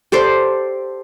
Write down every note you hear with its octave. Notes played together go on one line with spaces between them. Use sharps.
G4 A4 C5 D5